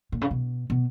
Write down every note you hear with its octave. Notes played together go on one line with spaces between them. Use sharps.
A#2
C#3
B2
B2